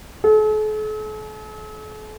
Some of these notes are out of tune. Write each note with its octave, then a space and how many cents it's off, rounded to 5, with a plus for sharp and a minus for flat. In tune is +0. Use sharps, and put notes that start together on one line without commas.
A4 -45